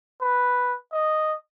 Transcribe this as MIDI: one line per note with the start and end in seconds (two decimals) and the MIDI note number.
0.21 0.76 71
0.92 1.36 75